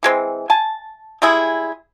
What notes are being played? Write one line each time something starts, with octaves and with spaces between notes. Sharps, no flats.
E3 G#3 C4
G#5 A5
G3 G#3 E4 G#4